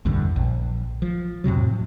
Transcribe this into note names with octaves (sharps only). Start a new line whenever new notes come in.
A#1 E2 G2 D3
A#1
F3
F2 A2 C3 F#3